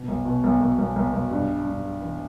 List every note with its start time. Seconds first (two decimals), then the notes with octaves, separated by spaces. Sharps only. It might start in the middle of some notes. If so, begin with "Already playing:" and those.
Already playing: B2
0.08 B1
0.25 B2
0.44 B1
0.61 B1
0.79 B1
0.96 B1
1.13 B1
1.31 G2
1.49 G3
1.67 G2
1.84 G3
2.01 E3